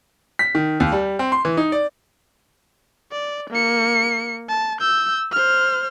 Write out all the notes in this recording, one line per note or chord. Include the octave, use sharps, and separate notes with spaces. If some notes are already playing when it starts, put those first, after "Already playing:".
B6
D#3
D#2
G3
C4
C6
E3
D#4
D5
D5
A#3 C#7
A5
E6 G6
C5 F6